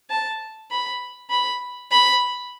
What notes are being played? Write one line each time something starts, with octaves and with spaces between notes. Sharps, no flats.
A5
B5
B5
B5